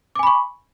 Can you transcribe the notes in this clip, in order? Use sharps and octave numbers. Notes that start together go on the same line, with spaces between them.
G#5 B5 C#6 D6